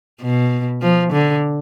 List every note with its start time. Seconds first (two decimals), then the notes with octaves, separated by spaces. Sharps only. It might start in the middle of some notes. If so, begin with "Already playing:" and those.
0.22 B2
0.82 F3
1.12 D3